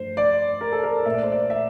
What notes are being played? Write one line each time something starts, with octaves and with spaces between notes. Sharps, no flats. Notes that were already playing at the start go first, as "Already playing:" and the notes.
Already playing: G2 F3 A3 C5
D5
A#4
A4
A#4
A#2 A3 E5
D5
C5
D5
E5